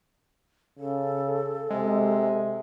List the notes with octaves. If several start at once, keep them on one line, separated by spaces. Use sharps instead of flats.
C#3 A4
C3 G#3